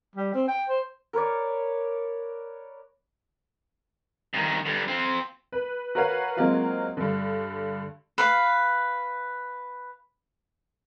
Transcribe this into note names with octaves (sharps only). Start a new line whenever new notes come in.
G3
C4
G5
C5
A#4 B4 C#5 D5
G2 D#3
G2 D3
C4 F4
B4
F#4 A#4 B4 C#5 F5 F#5
F#3 G#3 A#3 C4 F4 F#4
G2 D3
B4 F5